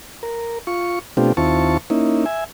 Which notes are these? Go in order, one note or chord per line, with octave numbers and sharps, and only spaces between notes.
A#4
F4 C#6
B2 A3 C4 D4 F4 G4
D#2 C4 E4 F4 A5 C#6
A#3 C#4 D#4 E4
E5 G#5